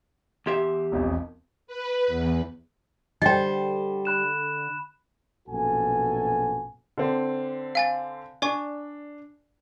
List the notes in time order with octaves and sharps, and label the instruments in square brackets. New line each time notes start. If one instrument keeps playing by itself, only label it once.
[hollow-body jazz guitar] E2 G4 E5 [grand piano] C6
[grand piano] E1 B1 F2
[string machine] B4
E2
[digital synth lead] D3 [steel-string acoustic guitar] G3 C5 [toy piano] D#5 G5
[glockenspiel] B5 F#6 E7
[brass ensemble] A#1 F#2 B2 F#4 A4 G#5
[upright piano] D3 C4
[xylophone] F5 G#5 A6
[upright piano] D4 [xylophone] D5 G#5 C#6